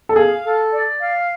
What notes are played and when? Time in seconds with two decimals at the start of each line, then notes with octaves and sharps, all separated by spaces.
0.09 A4
0.16 G#4 F5
0.44 A4
0.72 D5
1.00 F5